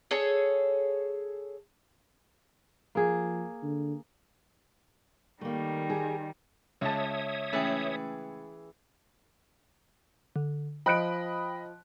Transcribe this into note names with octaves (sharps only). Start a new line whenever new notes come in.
G#4 A4 C#5
F3 A#3 G#4
D3
D#3 G3 A3 A#3
G4 G#4
C#2 C#5 E5 A5 D#6
E3 A3 C#4 G#4 B4 G5
D3
F3 D#5 G5 B5 F#6 D7